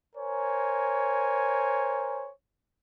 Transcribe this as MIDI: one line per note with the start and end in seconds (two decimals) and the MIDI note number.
0.16 2.30 70
0.16 2.30 72
0.16 2.30 73
0.16 2.30 80